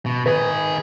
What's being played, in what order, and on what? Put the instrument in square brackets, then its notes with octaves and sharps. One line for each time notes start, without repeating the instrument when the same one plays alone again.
[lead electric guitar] B2
[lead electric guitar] D#3 G#4 [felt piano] B4